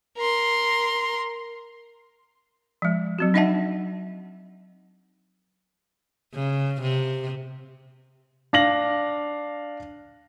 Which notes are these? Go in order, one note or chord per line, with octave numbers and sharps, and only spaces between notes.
A#4 C6
F3 G#3
F#3 C4 F#4
D4 D#4 D#5 E5 F#5 A5
C#3
C3
D4 F5 A#6 F#7